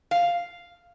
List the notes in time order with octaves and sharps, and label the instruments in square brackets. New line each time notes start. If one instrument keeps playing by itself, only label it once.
[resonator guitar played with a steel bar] F5